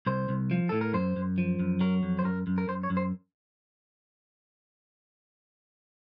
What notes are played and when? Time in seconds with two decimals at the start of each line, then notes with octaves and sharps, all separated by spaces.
0.06 C2 C5
0.29 C2
0.51 F3
0.69 A2 A4
0.81 A#4
0.93 F#2 C5
1.16 F#2
1.38 F3
1.59 F#2
1.81 F#3 A#4
2.03 F2
2.19 C5
2.24 F#2 A#4
2.47 F#2
2.58 A#4
2.68 F#2 C5
2.83 C#5
2.90 F#2
2.97 C5